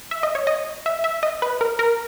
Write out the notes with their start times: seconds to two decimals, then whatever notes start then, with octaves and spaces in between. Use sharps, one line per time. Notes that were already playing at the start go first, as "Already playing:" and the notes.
0.11 E5
0.23 D#5
0.35 C#5
0.47 D#5
0.86 E5
1.04 E5
1.23 D#5
1.42 B4
1.61 A#4
1.79 A#4